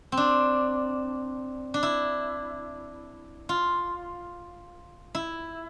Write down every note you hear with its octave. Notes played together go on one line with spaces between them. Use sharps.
C4
D4
D4
E4
F4
E4